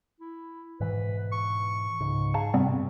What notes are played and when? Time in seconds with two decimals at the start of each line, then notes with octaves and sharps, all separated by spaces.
0.20 E4
0.80 G#2 B2 E3 B4
1.32 C#6
2.00 C#2 G#2
2.34 G#4 F5 A5 A#5
2.54 G2 C3 G3 B3 C4